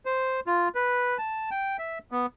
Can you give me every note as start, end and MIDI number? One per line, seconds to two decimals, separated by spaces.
0.05 0.40 72
0.47 0.68 65
0.75 1.18 71
1.18 1.50 81
1.51 1.77 79
1.79 1.99 76
2.11 2.26 59